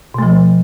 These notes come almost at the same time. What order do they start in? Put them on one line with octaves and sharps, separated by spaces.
B2 A3 F3